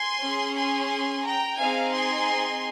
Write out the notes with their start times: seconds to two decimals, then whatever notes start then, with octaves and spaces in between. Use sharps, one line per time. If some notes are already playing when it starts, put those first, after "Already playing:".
Already playing: G#5 C6
0.22 C#4 G#4
0.57 G#5 C6
1.25 G5 A#5
1.59 C4 D#4 G#4 F5 G#5
1.93 G#5 C6